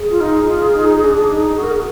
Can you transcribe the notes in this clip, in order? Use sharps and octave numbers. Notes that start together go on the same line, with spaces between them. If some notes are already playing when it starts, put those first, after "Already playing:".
Already playing: G#4
F4
D#4
F4
D#4
D4
D#4
F#4
A#4
G#4